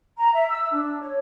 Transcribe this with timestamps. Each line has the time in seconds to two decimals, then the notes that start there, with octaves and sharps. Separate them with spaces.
0.17 A#5
0.34 E5
0.50 E6
0.71 D4
1.01 C#5